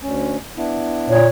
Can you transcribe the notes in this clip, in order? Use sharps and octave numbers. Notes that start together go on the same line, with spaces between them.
D2 C#4
B3 D4 E4
A#2 C#5